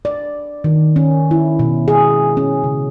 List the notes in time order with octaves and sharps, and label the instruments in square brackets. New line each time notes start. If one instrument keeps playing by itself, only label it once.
[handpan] D5
D#3
C#4
E4
B2
G#4
C#4
C#3